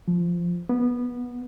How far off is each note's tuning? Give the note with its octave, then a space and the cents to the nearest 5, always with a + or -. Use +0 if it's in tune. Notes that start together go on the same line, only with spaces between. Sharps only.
F3 -10
B3 -15